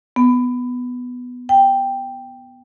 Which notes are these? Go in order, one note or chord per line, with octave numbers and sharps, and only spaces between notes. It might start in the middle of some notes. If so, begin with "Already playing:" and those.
B3
G5